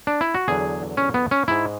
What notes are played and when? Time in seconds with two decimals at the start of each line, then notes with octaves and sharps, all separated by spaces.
0.07 D4
0.21 E4
0.34 F#4
0.48 E2 D3 F#3 G#4
0.97 C#4
1.14 B3
1.31 C#4
1.48 G#2 G#3 E4